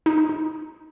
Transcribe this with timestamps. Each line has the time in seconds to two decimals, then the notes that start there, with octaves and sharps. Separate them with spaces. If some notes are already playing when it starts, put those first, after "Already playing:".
0.06 D#4
0.18 D#4
0.29 D#4